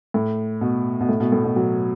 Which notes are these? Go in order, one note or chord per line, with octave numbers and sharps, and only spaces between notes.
A2
B2
B2
A2
B2
A2
B2
F#3